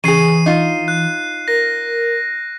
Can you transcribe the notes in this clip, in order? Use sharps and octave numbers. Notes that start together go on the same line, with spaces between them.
C#3 E3 G#4 C7 D#7
D#4 F4
F#6
A#4 A#6